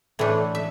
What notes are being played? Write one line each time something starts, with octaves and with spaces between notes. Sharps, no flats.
A2 E3 A3 D4
E5